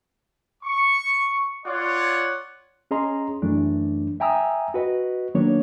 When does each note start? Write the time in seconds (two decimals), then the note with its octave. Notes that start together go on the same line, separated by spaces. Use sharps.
0.63 C#6
1.65 F4 C#5 D5 F#5
2.91 C#4 G#4 D#5 A#5 C6
3.42 F#2 E3 A3 D4
4.20 E5 G5 G#5 A#5 D#6 E6
4.74 F#4 B4 D#5
5.35 D#3 F#3 A#3 B3 D4 C#5